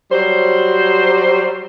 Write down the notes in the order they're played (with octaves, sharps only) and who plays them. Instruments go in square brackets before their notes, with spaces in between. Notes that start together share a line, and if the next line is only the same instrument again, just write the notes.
[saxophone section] F#3 G3 C5